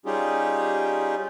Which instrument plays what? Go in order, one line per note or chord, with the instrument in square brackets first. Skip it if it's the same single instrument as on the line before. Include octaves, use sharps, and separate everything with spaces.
[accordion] G3 C#4 D#4 F4 G4 G#4